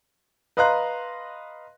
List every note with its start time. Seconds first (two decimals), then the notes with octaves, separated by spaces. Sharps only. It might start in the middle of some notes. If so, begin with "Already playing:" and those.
0.57 B4 D#5 F5 A#5 C6 F#6